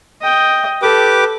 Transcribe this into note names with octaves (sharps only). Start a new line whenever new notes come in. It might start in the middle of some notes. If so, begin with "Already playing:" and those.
D#5 G5
G4 A4 B4 D6